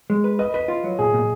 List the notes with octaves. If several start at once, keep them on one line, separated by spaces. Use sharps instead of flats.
G#3
B4
B4 D#5
B4 D#5
F4
F#3
A#2 G#4
A#2